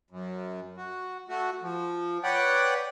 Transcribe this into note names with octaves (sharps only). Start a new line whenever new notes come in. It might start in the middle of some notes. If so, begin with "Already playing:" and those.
F#2
F#4
A3 F#4
F3
B4 C#5 D5 F#5 G5